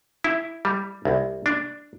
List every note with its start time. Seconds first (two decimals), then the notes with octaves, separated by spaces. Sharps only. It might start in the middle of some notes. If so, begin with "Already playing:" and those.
0.24 E4
0.65 G3
1.05 C2
1.46 D4